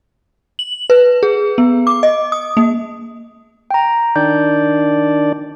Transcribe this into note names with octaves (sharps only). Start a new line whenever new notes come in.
F#7
B4
G#4
B3
D6
D#5
D#6
A#3
G5 A#5
D#3 D4 D5 G6